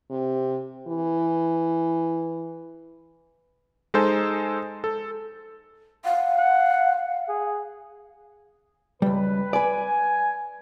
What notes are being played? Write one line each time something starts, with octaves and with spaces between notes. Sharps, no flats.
C3
E3
G#3 D#4 A4 C5 G#5
A4
F5 F#5
F#5
G#4
C#2 G3 B4
B4 D5 G#5